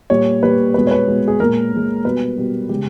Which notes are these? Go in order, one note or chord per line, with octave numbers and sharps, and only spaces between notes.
A#2 G3 C#5
A#2 G3 B4
B2 G#3 B4
C#5
B4
B2 G#3
G#4
A#2 G#3 A#4
A#2 G#3
B2 G3 B4
B2 G3
C#3 G#3 G4